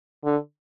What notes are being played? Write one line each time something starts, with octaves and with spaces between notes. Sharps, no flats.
D3